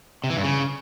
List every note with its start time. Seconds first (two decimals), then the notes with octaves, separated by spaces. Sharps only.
0.24 C3
0.30 E3
0.37 G2
0.43 C#3